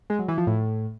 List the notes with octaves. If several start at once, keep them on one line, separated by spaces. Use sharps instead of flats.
G#3
F#3
E3
F3
A2